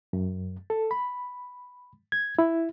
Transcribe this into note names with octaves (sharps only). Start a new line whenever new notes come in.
F#2
A4
B5
G#6
E4